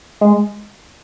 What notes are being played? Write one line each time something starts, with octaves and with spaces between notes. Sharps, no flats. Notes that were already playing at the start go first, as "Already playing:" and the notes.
G#3